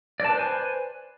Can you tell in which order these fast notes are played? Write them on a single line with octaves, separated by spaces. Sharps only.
D5 A5 B4 C5 G#5